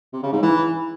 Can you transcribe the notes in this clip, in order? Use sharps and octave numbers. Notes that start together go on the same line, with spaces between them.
C3
C#3
G#2
E3